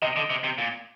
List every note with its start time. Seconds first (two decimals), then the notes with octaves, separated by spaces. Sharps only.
0.02 C3 D#5
0.16 D3
0.30 C3
0.44 C3
0.58 A#2